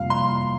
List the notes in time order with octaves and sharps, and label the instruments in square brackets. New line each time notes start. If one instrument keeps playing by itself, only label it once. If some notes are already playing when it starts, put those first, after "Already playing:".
Already playing: [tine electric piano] F2 C3 G3 A#3 F4 [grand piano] F5
[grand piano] C6